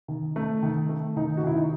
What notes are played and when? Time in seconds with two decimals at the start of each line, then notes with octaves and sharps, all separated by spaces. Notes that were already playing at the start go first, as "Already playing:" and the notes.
0.08 D#3
0.36 A3
0.63 D#3
0.89 A3
1.16 D#3 D#4
1.37 F#4
1.43 D#3 E4
1.57 D#4